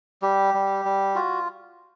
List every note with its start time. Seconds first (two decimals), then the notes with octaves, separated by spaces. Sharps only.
0.22 G3 G4
0.54 G3
0.85 G3
1.15 F4 F#4